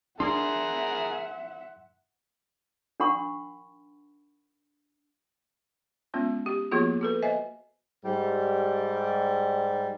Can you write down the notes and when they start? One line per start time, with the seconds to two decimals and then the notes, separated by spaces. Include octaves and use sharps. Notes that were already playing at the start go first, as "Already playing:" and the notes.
0.20 D4 G#4 A#4 E5 F#5 C6
3.00 D4 A#4 F#5 B5 C#6
6.14 G#3 B3 C#4 F4
6.46 G4
6.71 F3 A#3 B3 F4 F#4 G#4
7.01 F#4 A4 B4
7.22 C5 D#5 E5 G#5
8.05 G#2 G3